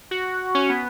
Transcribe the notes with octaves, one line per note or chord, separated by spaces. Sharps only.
F#4
C#4
B3